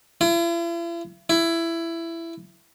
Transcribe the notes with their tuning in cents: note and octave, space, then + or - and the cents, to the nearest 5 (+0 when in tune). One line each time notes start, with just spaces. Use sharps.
E4 +45
E4 +15